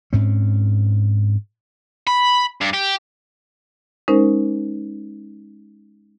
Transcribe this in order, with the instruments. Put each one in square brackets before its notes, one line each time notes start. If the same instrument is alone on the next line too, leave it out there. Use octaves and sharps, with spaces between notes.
[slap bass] G#2 C4 C#4
[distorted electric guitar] B5
G2
G4
[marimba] G#3 C#4 D#4 A#4 C5